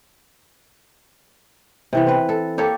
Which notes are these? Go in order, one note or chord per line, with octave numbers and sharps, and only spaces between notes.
C3 E3 B3
C4 B4
A4
A#3 G4 A4 C#5